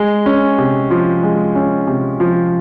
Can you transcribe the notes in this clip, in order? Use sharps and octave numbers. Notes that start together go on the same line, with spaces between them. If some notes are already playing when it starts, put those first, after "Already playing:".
Already playing: G#3
C#4
C3
F3
G#3
C#4
C3
F3